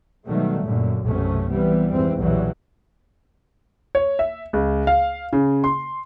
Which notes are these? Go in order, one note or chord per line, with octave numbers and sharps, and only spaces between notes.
B2 D#3 F#3 G3 A3
F#2 A#2 D3
B1 F#2 C3 A3 C#4
C3 E3 G3 B3
F2 G#2 E3 C4
B1 E2 A#2 E3 F#3 G3
C#5
E5
C#2
F5
C#3
C6